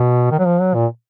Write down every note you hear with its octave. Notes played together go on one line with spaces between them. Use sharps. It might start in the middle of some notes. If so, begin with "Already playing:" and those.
Already playing: B2
D#3
F#3
F3
F#3
A#2